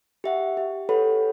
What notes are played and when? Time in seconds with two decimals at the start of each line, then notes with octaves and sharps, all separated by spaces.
0.24 G4 E5 F#5
0.57 G4
0.89 G4 A4 B4 C#5 F#5 B5